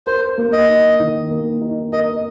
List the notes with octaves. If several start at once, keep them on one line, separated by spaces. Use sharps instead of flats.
A#4 C5
A#3
D#5
D#4
D#3
A#3
D#4
A#4 D#5